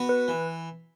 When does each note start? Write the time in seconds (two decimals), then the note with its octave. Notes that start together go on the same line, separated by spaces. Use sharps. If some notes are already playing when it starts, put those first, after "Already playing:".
Already playing: B3 F#4
0.09 B4
0.28 E3